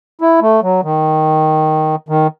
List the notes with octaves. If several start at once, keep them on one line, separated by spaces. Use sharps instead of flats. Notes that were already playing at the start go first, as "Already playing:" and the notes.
E4
A3
F#3
D#3
D#3